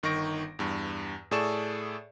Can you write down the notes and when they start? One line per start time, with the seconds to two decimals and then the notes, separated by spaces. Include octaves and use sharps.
0.03 G1 D#3 D#4 C#6 A#6 D7
0.59 E2 G2
1.31 A2 G#4 A4 D5 C#6 E7